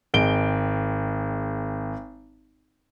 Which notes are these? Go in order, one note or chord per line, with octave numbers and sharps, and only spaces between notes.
G#1 G#3 D7 G7